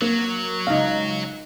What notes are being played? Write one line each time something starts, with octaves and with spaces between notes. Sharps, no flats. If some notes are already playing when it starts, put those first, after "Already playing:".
F#3 A#3
C#2 D#4 F5